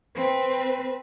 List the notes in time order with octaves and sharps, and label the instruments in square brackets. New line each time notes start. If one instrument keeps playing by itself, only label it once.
[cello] C4 B4